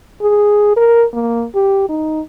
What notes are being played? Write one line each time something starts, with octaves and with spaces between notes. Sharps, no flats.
G#4
A#4
A#3
G4
D#4